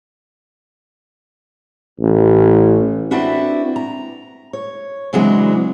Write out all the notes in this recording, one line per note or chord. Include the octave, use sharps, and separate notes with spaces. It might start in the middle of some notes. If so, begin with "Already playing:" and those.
A1
C4 D4 E4 F#4 B4
A#5
C#5
C#3 E3 F#3 G#3 C4 D4